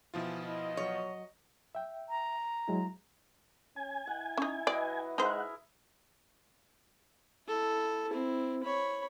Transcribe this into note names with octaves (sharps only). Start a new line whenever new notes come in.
B2 E3 F3 F4
E4 D#5
F#3 C#5
E5 G5
A#5
F#3 G#3 E4
C#4 G#5
E4 F#5
C#4 D#4
F#3 B4 D5 D#5
G#3 D#4 E4 G#4 A#4 C5 F#5
E4 A4
C4 E4
C#5 B5